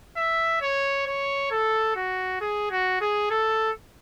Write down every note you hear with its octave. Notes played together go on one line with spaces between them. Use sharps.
E5
C#5
C#5
A4
F#4
G#4
F#4
G#4
A4